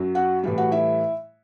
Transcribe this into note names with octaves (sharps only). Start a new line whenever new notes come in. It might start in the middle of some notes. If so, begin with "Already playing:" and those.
Already playing: F#2 F#3
F#4 F#5
A2 E3 G3
F#4 F#5
E4 E5